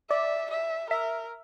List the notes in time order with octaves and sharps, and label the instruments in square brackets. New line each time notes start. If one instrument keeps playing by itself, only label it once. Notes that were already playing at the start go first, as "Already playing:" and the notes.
[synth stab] D5 [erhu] E5
[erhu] E5
[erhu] A#4 [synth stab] E5